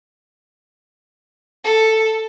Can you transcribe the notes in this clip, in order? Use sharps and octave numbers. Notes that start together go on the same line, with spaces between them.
A4